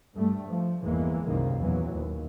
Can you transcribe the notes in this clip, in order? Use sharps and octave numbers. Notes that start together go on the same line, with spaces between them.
G2 G3 A3
F3
G1 E2 E3 G#3 A#3
C2 F#2 D#3 A#3
E2 A#2 E3 F#3
D#2